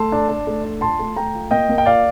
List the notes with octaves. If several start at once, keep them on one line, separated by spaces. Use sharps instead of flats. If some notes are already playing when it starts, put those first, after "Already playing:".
Already playing: A3 A5 C6
D4
D4
A3
D4
F4 A5 C6
A3
A3 G5 A#5
F4
A#3 D#5 G5
A#3
G5
F4 D5 F5